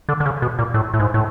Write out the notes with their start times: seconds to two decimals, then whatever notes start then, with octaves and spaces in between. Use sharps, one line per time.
0.09 D3
0.20 D3
0.26 C#3
0.42 B2
0.59 A#2
0.74 A2
0.94 A2
0.99 G#2
1.14 A2